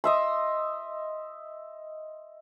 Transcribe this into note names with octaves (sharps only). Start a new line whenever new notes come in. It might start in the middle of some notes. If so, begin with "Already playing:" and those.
D#5 E5 C6